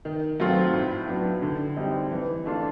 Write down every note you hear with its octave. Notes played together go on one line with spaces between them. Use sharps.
D#3
F#3 A3 C4 F4
A2
F#3 B3 D4
D3
G3 C4 D#4
E3
A3 D4 F4